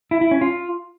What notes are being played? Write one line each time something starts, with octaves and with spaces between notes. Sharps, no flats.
E4
E4
C#4
F4